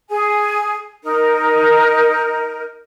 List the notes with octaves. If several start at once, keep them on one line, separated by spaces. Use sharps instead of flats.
G#4 G#5
D#4 A#4